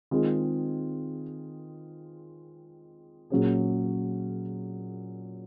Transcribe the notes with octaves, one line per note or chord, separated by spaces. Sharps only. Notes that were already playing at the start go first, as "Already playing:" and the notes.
D#3 G#3 C4 F4 G#4
A#2 F#3 C#4 G#4